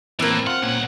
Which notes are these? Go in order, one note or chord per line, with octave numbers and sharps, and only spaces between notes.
A2 E3 A#3 C4 A#4
F4 F#5
B1 A#2 C#4 F#5